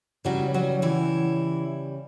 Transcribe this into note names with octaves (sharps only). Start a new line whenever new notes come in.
C#3 E3 F#3 G3 F#4
F#3 F#4
E3 E4